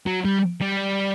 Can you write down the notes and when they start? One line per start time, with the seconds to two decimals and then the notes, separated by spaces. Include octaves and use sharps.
0.07 F#3
0.25 G3
0.62 G3